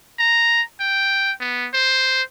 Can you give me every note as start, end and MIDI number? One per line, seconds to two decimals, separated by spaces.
0.19 0.62 82
0.80 1.32 79
1.40 1.68 59
1.74 2.22 72